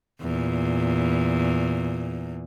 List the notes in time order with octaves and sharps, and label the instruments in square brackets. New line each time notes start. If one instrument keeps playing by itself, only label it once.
[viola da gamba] E2 A#2